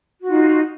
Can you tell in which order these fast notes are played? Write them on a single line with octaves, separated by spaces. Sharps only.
F#4 F4 D#4